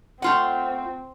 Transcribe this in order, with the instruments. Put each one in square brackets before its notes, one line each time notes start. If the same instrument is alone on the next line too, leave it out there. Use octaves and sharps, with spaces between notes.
[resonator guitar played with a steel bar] A3 F4 F#5 [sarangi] C4